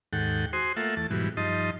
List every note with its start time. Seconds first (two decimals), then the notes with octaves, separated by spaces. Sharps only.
0.13 D#2 G#2 A4 F#5 G5
0.53 F#4 C5 G#5 C6 D#6
0.76 A3 A#3 F4 A4 E5 F#5
0.97 E2 A3 A5
1.10 G#2 B2 E3 F#3 G3
1.37 G2 F3 D#4 D#5 A5 C6